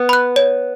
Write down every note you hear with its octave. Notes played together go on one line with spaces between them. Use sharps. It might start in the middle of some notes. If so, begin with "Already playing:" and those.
Already playing: B3
B5 F#6
C#5